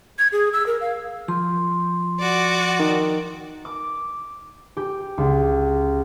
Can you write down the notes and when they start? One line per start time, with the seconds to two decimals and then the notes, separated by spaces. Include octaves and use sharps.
0.19 G#6
0.32 G#4
0.53 E6
0.67 A#4
0.81 F5
1.28 F3 C6
2.19 F#4 D5
2.80 D#3
3.65 D6
4.77 G4
5.18 C#2